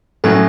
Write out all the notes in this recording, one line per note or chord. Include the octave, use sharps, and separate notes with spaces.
A2 F#3 C#4 A4